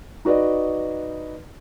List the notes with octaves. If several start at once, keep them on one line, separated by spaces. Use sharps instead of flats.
D#4 F#4 B4 D5 D#5